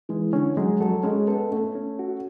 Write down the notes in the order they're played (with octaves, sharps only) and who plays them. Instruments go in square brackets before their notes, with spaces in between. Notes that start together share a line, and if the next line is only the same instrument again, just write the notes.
[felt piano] E3 [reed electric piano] G#3
[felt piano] D3 [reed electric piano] C#4
[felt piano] F#3 [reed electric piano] G#3
[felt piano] F#3 [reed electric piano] A4
[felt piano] G#3 [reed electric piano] C#4
[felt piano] B3 [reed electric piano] A4
[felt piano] A3 [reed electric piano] C#4
[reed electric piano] C#4
F#4